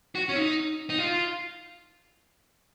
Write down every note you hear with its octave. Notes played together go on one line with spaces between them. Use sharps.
F#4
C#4
D#4
D#4
F4